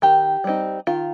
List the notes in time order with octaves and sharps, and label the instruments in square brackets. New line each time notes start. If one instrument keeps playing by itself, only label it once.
[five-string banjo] D#3 G4
G3 C4 D#4
D#3 F4